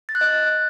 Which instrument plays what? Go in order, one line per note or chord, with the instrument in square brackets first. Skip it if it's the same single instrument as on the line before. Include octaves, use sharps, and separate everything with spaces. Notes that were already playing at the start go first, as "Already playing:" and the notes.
[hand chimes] A6
F#6
D#5